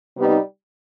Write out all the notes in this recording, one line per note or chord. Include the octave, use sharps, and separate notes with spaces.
C3 G3 B3 D#4